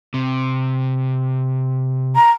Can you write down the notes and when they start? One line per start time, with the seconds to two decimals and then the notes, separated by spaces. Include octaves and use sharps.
0.14 C3
2.16 A#5